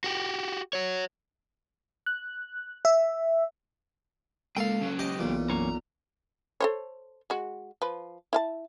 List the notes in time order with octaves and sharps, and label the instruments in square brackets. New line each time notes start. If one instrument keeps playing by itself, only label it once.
[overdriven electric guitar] F#4 G4
F#4 C#5
[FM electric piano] F#6
E5
[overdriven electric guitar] C#2 G#3 [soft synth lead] A#3 [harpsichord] A4 [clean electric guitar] F5 G5
[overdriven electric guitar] C#2 F#3 [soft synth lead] C#4
[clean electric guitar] G4 [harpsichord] D#5
[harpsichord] B1 A#2 [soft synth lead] E3
[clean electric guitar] F#2 A#3 C#4 [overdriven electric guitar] A#5
[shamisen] A4 C5 C#5
G#3 F#4
F3 B4
E4 F5 A5